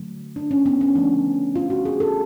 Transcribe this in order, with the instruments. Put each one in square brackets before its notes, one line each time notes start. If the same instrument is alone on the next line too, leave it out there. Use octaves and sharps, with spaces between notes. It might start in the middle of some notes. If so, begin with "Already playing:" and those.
Already playing: [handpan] D3 F#3 A3
D4
C#4
B3
C#4
D3 F3 A3 D4
F4
F#4
G#4
A4